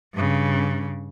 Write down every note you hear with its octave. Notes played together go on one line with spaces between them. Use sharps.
G2 C#3